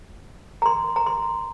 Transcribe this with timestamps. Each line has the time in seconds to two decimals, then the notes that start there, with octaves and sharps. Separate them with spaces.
0.62 A#5
0.66 C6
0.96 A#5
1.06 C6